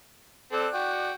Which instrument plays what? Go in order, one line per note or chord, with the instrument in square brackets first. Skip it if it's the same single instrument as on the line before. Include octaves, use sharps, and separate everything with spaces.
[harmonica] C4 A4 [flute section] D5 D6 F#6
[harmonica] F#4 G5